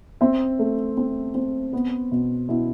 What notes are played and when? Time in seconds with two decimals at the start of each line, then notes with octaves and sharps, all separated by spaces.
0.21 C4 E5
0.59 A3
0.97 C4
1.35 C4
1.73 B3
2.12 B2
2.49 B2 E4